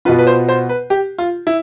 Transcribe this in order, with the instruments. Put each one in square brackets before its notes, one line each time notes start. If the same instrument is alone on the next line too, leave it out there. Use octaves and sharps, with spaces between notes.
[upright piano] B2 B3 F4 [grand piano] B4
[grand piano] B4
C5
C5
B4
G4
F4
E4